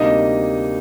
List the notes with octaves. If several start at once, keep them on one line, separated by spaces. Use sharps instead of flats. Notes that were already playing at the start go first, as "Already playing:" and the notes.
Already playing: D2 C3 G3 A#3 D#4 D#5